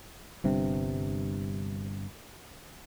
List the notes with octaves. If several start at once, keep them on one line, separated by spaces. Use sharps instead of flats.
G1 G2 C3